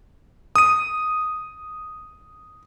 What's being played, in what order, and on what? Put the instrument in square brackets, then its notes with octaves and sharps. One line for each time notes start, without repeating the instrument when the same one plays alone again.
[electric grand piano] D#6 D#7